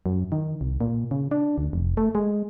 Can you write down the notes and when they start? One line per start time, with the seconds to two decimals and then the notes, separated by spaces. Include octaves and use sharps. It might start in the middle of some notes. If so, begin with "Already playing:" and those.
0.06 F#2
0.32 D#3
0.61 C2
0.81 A#2
1.11 C#3
1.31 D4
1.58 D2
1.73 F1
1.97 A3
2.15 G#3